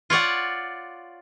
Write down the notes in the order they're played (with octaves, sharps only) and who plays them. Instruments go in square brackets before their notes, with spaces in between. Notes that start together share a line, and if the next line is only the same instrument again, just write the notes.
[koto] F4 C#5 D5 F#5